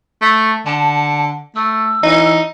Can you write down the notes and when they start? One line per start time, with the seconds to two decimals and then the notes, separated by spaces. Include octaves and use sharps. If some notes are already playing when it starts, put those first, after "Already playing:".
0.21 A3
0.66 D3 A5
1.56 A3 E6
2.03 E3 D#4